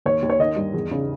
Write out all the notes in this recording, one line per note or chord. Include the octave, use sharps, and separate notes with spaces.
D#2 C#5
D#2
C#5
D#3 D#5
G2
E2
C#3